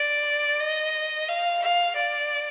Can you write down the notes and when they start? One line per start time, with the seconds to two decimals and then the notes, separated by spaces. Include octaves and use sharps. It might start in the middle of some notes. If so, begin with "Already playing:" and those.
Already playing: D5
0.61 D#5
1.29 F5
1.62 F5
1.96 D5